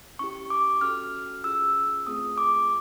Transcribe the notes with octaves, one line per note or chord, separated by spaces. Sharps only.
C#4 E4 G4 C#6
D6
C#4 F#4 A4 F6
C#4 F4 G#4 E6
A3 C4 F4 G#4 D#6
D6